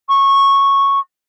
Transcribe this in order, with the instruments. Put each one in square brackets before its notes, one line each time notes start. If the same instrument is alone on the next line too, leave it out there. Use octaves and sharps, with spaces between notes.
[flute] C#6